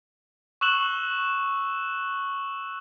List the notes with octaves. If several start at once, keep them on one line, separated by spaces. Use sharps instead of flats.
C#6 E6 F#6 E7 F#7 G7